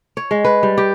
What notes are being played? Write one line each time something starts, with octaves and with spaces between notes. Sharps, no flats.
C#5
G#3
B4
G3
G4